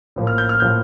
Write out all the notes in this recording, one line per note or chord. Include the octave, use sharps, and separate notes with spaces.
A2 F3 A#3
F6
G6
F6
A2 F3 A#3 G6